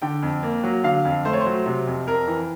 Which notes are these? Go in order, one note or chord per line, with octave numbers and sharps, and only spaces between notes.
D3 G5
F2
A#3
F#3
D3 F5
F2
A3 C5
C#5
C5
F#3
C3
F2
F2 A#4
E3